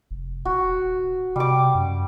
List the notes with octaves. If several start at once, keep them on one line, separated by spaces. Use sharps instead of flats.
F1
D#1 F#4
C3 G3 D6
F#2